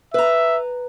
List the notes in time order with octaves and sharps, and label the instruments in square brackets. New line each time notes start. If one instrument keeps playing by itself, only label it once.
[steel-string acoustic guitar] B4 A#5 [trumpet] E5